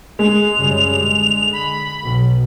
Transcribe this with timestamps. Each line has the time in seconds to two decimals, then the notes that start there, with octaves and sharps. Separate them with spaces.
0.19 G#3 F7
0.59 F#2 C#3 G3
0.97 D3
1.53 B5
2.02 B1